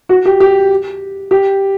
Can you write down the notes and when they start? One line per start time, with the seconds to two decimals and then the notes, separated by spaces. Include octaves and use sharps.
0.09 F#4
0.26 G4
0.40 G4
1.31 G4